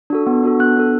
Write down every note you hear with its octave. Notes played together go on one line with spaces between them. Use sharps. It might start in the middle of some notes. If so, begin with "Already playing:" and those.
D4 F#4 A4
B3
D4 F#4 A4
B3 F#6
D4 A4